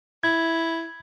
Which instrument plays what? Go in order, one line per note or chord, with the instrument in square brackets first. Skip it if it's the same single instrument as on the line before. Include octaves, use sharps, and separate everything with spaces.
[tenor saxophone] E4 [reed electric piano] G#6